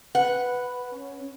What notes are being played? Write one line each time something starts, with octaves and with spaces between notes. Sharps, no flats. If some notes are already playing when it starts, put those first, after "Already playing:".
B4 F#5
C#4